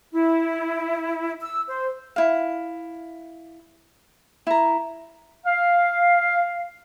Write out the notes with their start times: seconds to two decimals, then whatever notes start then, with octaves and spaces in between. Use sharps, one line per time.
0.14 E4
1.41 E6
1.68 C5
2.16 E4 F5
4.47 E4 A#5
5.45 F5